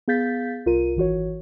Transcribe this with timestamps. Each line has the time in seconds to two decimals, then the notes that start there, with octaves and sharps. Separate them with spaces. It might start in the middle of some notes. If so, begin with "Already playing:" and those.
0.08 B3 G#4 F5 G6 A6 B6
0.66 C2 F4 A#4 D#7
0.96 G#1 E3 F#4 C#5